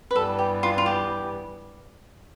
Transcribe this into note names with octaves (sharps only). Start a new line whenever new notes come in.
B4
G2 E3 G3 B3 A4
G4
F4
F4
G4